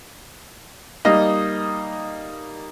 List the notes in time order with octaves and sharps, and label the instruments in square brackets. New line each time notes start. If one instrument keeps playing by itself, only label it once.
[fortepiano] G3 A#3 D#4 D#5